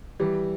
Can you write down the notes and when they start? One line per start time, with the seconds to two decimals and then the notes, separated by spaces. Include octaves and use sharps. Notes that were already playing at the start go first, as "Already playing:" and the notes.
0.20 E3 G3